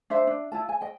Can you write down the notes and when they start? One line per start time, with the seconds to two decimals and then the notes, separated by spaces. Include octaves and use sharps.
0.10 D4 C5 E5
0.27 D4
0.52 E4 F4 A5
0.69 G#5
0.81 D#5 G5